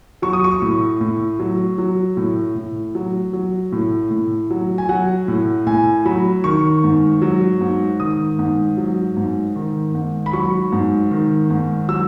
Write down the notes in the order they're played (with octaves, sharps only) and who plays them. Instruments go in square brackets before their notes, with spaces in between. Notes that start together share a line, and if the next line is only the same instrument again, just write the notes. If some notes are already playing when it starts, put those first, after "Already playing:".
[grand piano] F#3 C#6
D#6
C#6
A2
A2
F#3
F#3
A2
A2
F#3
F#3
A2
A2
F#3
G#5
F#3 F#5
A2
A2 G#5
F#3 B5
D#3 C#6
G#2
F#3
G#2
D#3 D#6
G#2
F#3
G#2
D#3
G#2
B5
F#3 C#6
G#2
D#3
G#2
F#3 E6